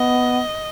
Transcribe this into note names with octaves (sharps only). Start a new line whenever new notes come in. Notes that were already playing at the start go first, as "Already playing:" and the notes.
Already playing: B3 D#5